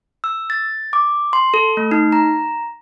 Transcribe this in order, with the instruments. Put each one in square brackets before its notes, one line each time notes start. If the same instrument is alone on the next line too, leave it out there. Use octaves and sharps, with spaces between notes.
[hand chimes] E6
A6
D6
C6
A4
A3
D#4
A#5